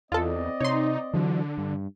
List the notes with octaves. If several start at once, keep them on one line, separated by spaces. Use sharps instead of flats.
E2 C4 F4 A4 D5 D#5
C3 D#4 C#5 C6
D3 E3 F#3
G2